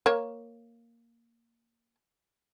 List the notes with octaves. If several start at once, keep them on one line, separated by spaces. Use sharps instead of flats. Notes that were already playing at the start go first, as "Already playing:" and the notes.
A#3 C#5